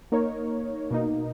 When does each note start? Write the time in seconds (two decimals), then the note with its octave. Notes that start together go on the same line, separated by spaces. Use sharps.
0.12 A#3 D#4 A#4 C#5
0.91 B2 A#3 D#4